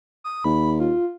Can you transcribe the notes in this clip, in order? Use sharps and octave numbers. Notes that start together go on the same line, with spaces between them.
D#6
D#2 B5
F4